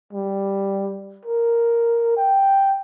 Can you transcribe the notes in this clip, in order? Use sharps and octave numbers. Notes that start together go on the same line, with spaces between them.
G3
A#4
G5